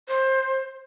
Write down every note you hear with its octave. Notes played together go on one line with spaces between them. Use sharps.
C5